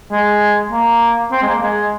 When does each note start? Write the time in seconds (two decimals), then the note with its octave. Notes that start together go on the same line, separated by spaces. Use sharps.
0.11 G#3
0.72 A#3
1.32 C4
1.42 G#3
1.48 A#3
1.62 G#3